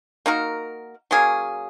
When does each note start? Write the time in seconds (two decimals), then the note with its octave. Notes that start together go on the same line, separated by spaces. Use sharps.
0.26 A#3 D#4 F#4 A#4
1.11 F#3 A#3 C#4 G#4